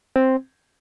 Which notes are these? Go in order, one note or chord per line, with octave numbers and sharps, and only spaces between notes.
C4